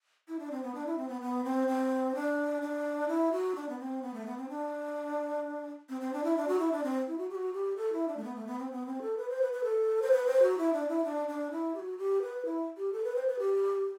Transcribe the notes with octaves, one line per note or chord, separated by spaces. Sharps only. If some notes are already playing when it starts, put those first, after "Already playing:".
E4
D4
C4
B3
D4
E4
C4
B3
B3
C4
C4
D4
D4
E4
F#4
D4
B3
C4
B3
A3
B3
C4
D4
C4
C4
D4
E4
D4
F#4
E4
D4
C4
E4
F#4
G4
F#4
G4
A4
E4
D4
A3
B3
A3
B3
C4
B3
C4
A4
B4
C5
B4
B4
A4
C5
B4
C5
F#4
E4
D4
E4
D4
D4
E4
G4
F#4
G4
B4
E4
G4
A4
B4
C5
B4
G4